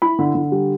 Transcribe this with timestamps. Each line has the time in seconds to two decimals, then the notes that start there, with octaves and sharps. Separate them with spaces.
0.02 E4 B5
0.19 D3
0.35 D3
0.52 G3